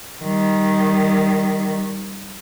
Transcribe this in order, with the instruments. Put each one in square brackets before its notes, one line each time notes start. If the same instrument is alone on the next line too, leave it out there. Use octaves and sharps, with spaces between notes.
[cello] D#3 G3